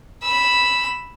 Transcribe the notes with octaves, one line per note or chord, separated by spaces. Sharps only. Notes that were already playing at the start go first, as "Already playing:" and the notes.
B5 E6